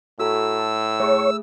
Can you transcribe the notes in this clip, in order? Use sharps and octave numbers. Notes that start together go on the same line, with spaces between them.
A2 F#4 A4 A#5 E6
A5
A3 G#4 C#5